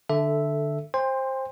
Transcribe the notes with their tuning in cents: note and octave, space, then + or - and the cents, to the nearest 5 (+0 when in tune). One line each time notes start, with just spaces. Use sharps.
D3 +15 A4 +0 E5 +0
C5 +15 G5 +40 C6 +0